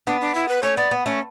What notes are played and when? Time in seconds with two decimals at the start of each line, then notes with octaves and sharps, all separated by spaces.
0.07 B3 D4
0.21 D4
0.35 E4
0.49 B4
0.63 A3 C#4 C#5
0.77 B3 D5
0.91 B3
1.06 A3 C#4